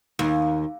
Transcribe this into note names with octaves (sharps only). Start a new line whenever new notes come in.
D#2